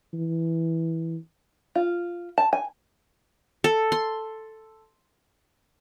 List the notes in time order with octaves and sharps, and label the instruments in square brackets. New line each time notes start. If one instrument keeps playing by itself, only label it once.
[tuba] E3
[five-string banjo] F4
A5
G#5
[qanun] A4
C6